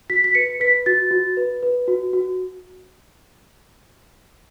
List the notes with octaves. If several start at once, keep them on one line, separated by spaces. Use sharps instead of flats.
F#4 B6
B6
B4 C#7
B4 B6
F#4 A6
F#4
B4
B4
F#4
F#4